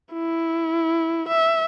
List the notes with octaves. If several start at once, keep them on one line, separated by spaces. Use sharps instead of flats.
E4
E5